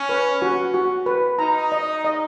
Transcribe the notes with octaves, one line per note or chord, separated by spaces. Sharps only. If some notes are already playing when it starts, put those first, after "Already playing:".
Already playing: C#4
B4
F#4
F#4
B4
D#4 A#5
D#5
D#5